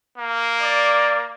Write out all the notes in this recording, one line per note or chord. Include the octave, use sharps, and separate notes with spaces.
A#3
D5